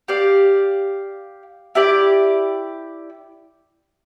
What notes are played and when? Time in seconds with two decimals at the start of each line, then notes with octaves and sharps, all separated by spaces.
0.08 G4 D5 F5
1.75 E4 G4 D5